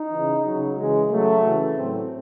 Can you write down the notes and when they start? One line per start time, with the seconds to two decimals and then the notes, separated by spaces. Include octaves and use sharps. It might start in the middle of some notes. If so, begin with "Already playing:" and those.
Already playing: D#4
0.11 C#3 E3
0.44 C#3 F#3
0.77 C#3 E3 G#3
1.10 C#3 F#3 A3
1.44 C#3 E3
1.76 A2 F#3 C4